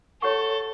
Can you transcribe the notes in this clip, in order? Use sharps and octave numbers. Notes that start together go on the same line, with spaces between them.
G4 A4 C#5 F#5 C#6